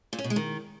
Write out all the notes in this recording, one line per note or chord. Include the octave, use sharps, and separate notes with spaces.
A#2
C#4
B2
G#3
D#3